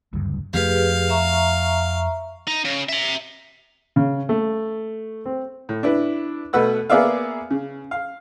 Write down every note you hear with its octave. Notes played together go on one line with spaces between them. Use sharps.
F#1 D2 G2
F2 F3 A3 G4 G#4 B4 F5
E5 A#5 C#6
D#4
C#3
E5 A#5
C#3
A3
C4
A2
D4 E4 B4
B2 A3 B4 F#5 E6
A#3 B3 G#4 D5 E5 F5
C#3
F5